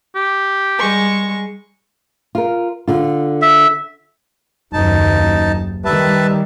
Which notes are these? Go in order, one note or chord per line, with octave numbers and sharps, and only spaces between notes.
G4
G3 G#3 C#6
F4 A#4
D3 F4
E5
F#1 D#2 D#4 A5
D#3 G3 B4 E5 A5